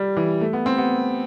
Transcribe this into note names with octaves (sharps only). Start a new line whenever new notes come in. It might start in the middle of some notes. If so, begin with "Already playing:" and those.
Already playing: G3
E3
A3
B3
C4
B3